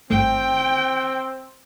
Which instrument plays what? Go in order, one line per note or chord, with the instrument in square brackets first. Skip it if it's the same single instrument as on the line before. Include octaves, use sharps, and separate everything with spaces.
[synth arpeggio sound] G#1 G2 A3 [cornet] C4 [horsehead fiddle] G5